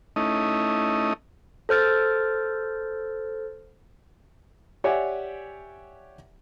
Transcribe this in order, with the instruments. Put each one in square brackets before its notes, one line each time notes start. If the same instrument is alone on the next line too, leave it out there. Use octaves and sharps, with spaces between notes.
[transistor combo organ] A3 C#4 D#4 E4 D#5
[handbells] A4 C5 F6 A6
[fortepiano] G4 C#5 D5 E5 F#5 G#5